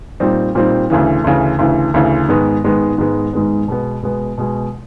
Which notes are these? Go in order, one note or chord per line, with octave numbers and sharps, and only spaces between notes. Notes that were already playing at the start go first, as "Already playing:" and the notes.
A#2 G3 C4 D#4
A#2 G3 C4 D#4
D2 C#3 E3
D2 C#3 E3
D2 C#3 E3
D2 C#3 E3
G#2 D#3 G#3 B3
G#2 D#3 G#3 B3
G#2 D#3 G#3 B3
G#2 D#3 G#3 B3
B2 G#3 B3
B2 G#3 B3
B2 G#3 B3